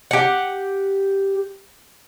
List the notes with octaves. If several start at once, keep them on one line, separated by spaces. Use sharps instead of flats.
G4 F#5